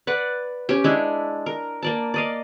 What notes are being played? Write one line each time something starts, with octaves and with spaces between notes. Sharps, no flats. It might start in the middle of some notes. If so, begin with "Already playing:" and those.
B4 D5 F#5
C#4 G4
G#3 D4 E4
A#4
A#3 D5 A5
D5 D#5 F5